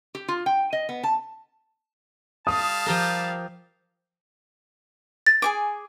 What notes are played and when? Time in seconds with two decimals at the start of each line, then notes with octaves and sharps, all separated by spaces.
0.15 G4
0.28 F4
0.46 G5
0.73 D#5
0.89 B3
1.03 A5
2.47 G3 F5 A5 D#6
2.86 F3 G4 A#4
5.27 A6
5.42 G#4 G#5 D6